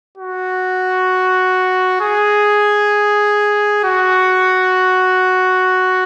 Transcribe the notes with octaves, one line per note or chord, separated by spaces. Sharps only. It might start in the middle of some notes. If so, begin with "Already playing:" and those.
F#4
G#4
F#4